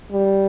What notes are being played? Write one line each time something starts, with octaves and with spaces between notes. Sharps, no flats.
G3